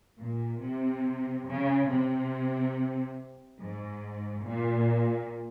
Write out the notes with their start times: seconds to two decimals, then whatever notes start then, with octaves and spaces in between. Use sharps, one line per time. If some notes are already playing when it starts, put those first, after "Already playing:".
0.20 A#2
0.62 C3
1.47 C#3
1.89 C3
3.60 G#2
4.44 A#2